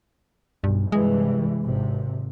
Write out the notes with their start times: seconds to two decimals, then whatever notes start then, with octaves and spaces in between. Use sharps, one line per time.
0.64 B1 G2
0.92 G2 C3 E3 G#3
1.62 G#1 C3